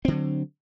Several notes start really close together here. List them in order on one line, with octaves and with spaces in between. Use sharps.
C4 D3 F#3